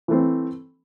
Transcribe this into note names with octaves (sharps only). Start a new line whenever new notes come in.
E3 A3 C4